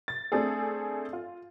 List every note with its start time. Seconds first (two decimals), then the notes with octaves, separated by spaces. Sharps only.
0.08 A6
0.32 A3 C4 D4 G#4 A4
1.13 F4